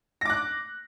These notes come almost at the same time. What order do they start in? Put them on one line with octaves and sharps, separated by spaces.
A#6 D6 F#6